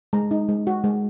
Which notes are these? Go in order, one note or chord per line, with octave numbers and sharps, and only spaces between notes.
G#3 A#5
D#4
G#3
F#4
G#3